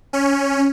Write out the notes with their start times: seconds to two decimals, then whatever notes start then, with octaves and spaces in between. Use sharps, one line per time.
0.13 C#4